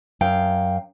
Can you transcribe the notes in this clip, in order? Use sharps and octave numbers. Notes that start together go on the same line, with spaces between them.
F#2 F5 G5